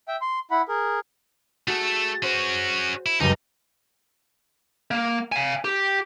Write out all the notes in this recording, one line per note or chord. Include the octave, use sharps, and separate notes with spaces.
E5 G5
C6
E4 F#5 B5
G#4 A#4
A3 F#4 G#4 A4
C#4 F#4 C5
E4
C#2 F#2 G3 D#4
A#3
F5 G#5
G4